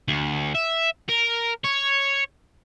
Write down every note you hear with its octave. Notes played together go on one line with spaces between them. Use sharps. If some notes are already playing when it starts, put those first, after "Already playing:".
D2
E5
A#4
C#5